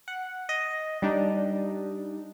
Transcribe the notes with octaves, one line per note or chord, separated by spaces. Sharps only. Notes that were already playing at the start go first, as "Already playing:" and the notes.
F#5
D#5
G3 D4 D#4